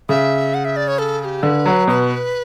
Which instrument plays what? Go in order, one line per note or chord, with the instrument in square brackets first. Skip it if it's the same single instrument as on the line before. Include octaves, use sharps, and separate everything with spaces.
[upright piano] C#3 [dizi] E5
[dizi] F#5
E5
D5
C#5
A4
A4
G4
[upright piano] D3 [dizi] B4
[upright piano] F#3
[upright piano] B2 [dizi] B4